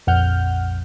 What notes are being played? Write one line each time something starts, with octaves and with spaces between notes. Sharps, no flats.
A#1 F2 F#5 F6 G6